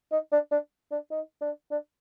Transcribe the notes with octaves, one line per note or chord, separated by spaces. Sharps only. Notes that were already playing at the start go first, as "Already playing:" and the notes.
D#4
D4
D4
D4
D#4
D4
D4